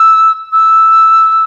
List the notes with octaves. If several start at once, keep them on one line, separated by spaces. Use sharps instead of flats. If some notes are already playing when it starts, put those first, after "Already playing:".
Already playing: E6
E6